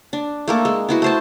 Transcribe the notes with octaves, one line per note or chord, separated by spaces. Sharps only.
D4
A3 A#3 A4
G#3
B3 E4 F#4
A3 C5 A5